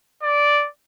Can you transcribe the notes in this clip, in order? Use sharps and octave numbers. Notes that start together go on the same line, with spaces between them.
D5